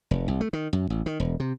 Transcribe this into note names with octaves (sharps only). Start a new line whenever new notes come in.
F1
C2
A3
D#3
F#2
A1
D#3
E1
C3